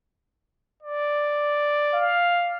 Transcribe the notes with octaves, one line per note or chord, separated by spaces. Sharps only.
D5
F5